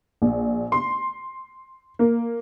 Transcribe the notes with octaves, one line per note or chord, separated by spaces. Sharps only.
A#1
C6
A#3